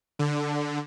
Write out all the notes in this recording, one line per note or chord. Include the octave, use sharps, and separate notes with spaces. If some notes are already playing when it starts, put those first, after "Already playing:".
D3